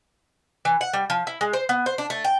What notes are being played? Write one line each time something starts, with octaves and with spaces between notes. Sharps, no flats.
E3
F#5
G3
F3
E4
G#3
C5
B3
C5
D4
A3
G5